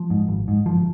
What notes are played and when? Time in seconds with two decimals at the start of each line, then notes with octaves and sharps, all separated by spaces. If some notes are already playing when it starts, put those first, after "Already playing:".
Already playing: F3
0.10 G#2
0.28 G#1
0.48 G#2
0.66 G1 F3